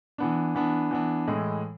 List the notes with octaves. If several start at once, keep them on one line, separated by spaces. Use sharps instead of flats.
E3 B3 D4
E3 B3 D4
E3 B3 D4
A2 E3 G#3